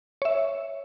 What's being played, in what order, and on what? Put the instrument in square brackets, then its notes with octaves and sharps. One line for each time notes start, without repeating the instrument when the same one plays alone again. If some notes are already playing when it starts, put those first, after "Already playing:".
[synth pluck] C#5 E5